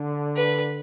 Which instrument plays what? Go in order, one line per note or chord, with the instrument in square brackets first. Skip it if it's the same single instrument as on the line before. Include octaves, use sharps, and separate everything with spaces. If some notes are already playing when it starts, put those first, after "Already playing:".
Already playing: [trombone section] D3
[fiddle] B4